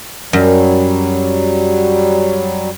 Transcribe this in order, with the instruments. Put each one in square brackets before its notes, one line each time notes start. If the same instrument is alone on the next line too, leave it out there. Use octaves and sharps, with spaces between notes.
[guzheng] F#2 [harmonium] F#3 G3